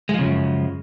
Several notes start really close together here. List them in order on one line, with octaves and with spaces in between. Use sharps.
G#3 F3 C#3 F#2